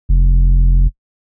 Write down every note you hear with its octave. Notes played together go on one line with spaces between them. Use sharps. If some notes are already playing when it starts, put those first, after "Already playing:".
F1